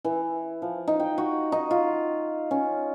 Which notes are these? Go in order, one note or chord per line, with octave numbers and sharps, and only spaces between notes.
E3
F3
D#4
G5
F#4
D#4
F4
C#4